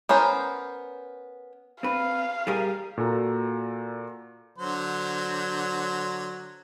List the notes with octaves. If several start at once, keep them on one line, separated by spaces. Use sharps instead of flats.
B3 C#4 A#4 C5
C4 B4 F5
G3 G#4 A#4
A#2 F#4 A4 A#5
D3 F#3 C5